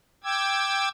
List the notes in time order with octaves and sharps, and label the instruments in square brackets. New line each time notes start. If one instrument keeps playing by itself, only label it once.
[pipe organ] G5 D6 E6 G#6